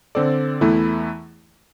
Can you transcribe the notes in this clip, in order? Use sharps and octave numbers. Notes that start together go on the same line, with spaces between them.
D3 C4 A4 D5
E2 E3 A3 E4